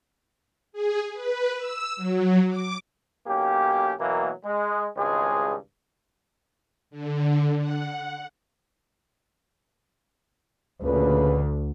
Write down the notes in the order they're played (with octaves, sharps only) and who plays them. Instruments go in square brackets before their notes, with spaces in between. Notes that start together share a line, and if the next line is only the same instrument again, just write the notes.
[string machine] G#4
B4
E6
F#3
D6
[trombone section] B1 A#3 C#4 G4
B2 E3 F#3 A#3
G#3
G#1 C#2 G2 G#3 G#4
[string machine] D3
F#5
[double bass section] D2 [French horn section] A#2 C#3 B4